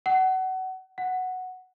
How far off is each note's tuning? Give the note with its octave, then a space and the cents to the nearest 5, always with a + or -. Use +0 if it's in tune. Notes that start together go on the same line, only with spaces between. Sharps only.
F#5 +25
F#5 +0